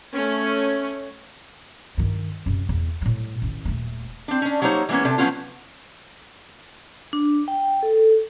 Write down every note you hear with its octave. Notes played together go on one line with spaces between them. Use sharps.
A3 C#4
G2 D#3
F#2 C3
E2
A2 G3
A1 D#3
D#1 A3
C4 D4
C#4 D4
F#3 G3 A#3 D#4 C5 C#5
E3 G#3 A#3 B3 C#4
C3 D4 A4
F3 F#3 B3 C#4 F4
D4
G5
A4